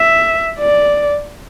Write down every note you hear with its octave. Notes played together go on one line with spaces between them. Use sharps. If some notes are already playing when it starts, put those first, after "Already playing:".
Already playing: E5
D5